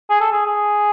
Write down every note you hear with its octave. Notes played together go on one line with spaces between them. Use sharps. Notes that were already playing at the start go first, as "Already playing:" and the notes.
G#4
A4
G#4
G#4